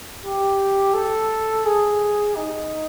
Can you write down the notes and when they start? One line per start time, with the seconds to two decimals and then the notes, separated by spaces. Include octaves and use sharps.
0.24 G4
0.94 A4
1.65 G#4
2.35 D#4